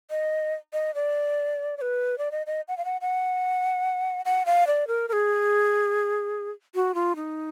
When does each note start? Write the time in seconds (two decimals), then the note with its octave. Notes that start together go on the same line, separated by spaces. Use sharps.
0.11 D#5
0.73 D#5
0.95 D5
1.77 D5
1.81 B4
2.18 D5
2.32 D#5
2.47 D#5
2.68 F#5
2.78 F5
2.85 F#5
3.01 F#5
4.25 F#5
4.46 F5
4.67 D5
4.88 A#4
5.09 A#4
5.13 G#4
6.75 F#4
6.95 F4
7.16 D#4